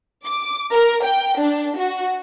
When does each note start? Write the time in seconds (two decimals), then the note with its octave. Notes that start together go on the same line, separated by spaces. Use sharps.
0.25 D6
0.71 A#4
1.03 G5
1.39 D4
1.78 F#4